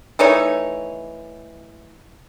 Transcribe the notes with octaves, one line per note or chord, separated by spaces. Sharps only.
E3 A3 D#4 C#5